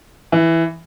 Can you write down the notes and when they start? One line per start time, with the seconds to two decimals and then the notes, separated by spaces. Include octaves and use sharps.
0.32 E3